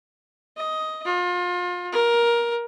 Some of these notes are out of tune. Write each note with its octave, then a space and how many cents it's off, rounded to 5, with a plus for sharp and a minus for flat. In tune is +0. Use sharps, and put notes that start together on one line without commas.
D#5 +10
F4 +30
A#4 +15